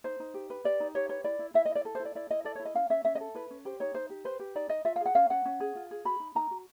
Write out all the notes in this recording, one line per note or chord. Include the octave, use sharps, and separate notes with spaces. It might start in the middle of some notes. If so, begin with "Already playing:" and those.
D#4 C5
D#4
G4
B4
G4 D5
D#4
G4 C#5
B4 C#5
E4 D5
E4
E4 E5
D#5
E4
D5
A4
C5
E4
D5
E4 D5
E4 D#5
A4 D5
C#5
E4
D#5
C#4 F5
C#4 E5
C#4 E5
D#5
A4
E4 B4
C#4
G4 C5
D#4 C#5
D#4 C5
G4
B4 C5
G4
D#4 D5
D#4 D#5
F4 E5
F5
G#4
F#5
C#4 F5
C#4 F#5
C#4
G#4
F4
G#4
F#4 B5
D#4
D#4 A#5
F#4